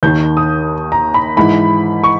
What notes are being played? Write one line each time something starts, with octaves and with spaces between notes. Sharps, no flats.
D#2 D#3 G6
D#6
A#5
B5
G#2 E3 B5
C#6